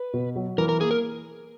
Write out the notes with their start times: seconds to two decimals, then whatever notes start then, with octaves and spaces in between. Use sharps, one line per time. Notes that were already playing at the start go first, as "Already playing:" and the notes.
Already playing: B4
0.14 B2
0.36 F#3
0.58 E3 A#4
0.69 A#4
0.81 A#3 G#4
0.91 A#4